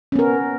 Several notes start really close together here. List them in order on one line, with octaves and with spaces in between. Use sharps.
C#4 B3 A#4